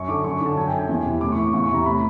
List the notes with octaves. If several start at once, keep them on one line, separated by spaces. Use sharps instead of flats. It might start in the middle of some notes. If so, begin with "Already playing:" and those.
Already playing: F#2 C#6
D3 D6
F#2 C#6
D3 A5
F#2 G#5
G5
D3
G#5
E2
C3 E3
A2 D6
E3 C#6
D6
E2 C#6
C#6
C3 E3 A#5
A2 B5